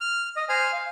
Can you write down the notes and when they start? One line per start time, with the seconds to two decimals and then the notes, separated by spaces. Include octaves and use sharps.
0.01 F6
0.36 D#5
0.49 C5 G#5 F6
0.72 F5